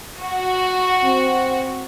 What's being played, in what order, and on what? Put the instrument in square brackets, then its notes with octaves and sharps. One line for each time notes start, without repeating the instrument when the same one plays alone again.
[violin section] F#4
[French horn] C4